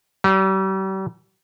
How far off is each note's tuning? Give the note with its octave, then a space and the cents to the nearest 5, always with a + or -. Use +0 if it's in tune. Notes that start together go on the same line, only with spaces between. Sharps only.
G3 -40